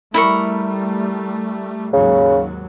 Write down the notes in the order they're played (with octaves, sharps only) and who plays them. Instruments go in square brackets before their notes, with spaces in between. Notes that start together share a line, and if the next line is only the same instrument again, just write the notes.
[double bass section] G3 A3 [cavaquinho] E4 A#4 C#6
[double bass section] D#2 G#2 F#3 [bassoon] C#3